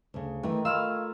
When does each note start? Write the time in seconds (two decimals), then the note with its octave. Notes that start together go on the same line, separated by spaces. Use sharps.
0.14 D2 C#3
0.43 D#3 E3 A3
0.65 A3 E4 F4 F5 E6 F6